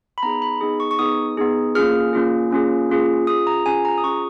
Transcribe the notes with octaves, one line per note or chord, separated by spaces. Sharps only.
B5
B3 D#4 G#4 A#5
B5
B3 D#4 G#4
C#6
C#6
B3 D#4 G#4 D#6
B3 D#4 G#4
A#3 C#4 F4 G#4 F6
A#3 C#4 F4 G#4
A#3 C#4 F4 G#4
A#3 C#4 F4 G#4
C#4 F4 G#4 D#6
A#5
C#4 F4 G#4 G#5
A#5
D#6
C#4 F4 G#4 C#6